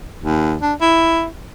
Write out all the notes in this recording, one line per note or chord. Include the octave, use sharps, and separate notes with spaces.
D#2
D4
E4